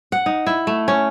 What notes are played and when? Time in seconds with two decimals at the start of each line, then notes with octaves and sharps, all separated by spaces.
0.12 F#5
0.26 D#4
0.47 E4
0.67 A3
0.88 C#4